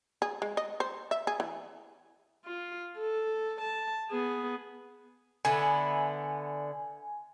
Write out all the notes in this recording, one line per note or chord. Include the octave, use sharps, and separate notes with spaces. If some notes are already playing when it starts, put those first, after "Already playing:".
G#4
G#3
D#5
C5
E5
G#4
E3
F4
A4
A5
B3 G#4
D3 B3 E4 G#5